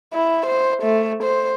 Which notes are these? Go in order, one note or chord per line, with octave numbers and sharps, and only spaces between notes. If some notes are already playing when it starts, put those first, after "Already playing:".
E4
C5
A3
C5